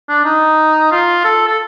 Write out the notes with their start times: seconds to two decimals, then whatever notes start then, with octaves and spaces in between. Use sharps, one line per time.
0.09 D4
0.25 D#4
0.92 F4
1.24 A4
1.47 A4